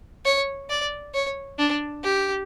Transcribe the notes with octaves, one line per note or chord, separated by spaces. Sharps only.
C#5
D5
C#5
D4
G4